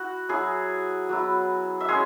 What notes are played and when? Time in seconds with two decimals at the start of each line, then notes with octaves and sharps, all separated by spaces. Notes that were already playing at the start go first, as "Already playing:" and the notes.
Already playing: E4 F#4
0.29 F#3 E4 G#4
1.09 F#3 B3 E4
1.80 E5
1.88 G#3 C#4 G#4 C#5